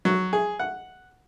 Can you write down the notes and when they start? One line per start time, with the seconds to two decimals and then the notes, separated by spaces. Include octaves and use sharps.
0.05 F#3
0.33 G#4
0.59 F#5